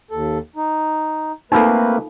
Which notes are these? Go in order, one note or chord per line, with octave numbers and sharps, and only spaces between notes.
D#2 A4
D#4
A3 A#3 C4 D#4 F4 A4 B4